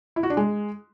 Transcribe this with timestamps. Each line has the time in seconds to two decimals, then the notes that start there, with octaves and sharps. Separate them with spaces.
0.16 E4
0.23 F#4
0.30 D4
0.37 G#3